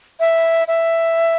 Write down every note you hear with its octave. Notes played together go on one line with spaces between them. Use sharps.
E5
E5